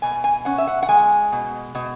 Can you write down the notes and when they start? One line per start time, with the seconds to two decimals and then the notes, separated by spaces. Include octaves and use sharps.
0.02 B2 G#5
0.24 G#5
0.45 C#4 F#5
0.58 E5
0.67 F#5
0.83 F#5
0.89 G#3 G#5
1.32 B2
1.75 B2